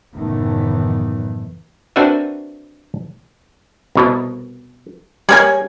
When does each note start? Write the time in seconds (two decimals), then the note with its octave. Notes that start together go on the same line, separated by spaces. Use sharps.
0.15 F#1 A2 D#3 E3 A3 B3
1.96 C4 D4 F#4 A#4 B4 E5
3.95 C2 B2
5.29 G3 A#3 G#4 C#5 G#5